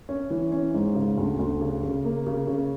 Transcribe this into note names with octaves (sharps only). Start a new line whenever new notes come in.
C#4
E3
C#4
G#2
C#3
D2
D2
C#3
C#3
A#3
C#3
C#3